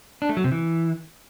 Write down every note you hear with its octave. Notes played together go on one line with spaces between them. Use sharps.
D4
A3
F#3
C3
E3